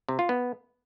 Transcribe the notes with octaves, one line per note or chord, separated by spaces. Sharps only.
C3
F4
B3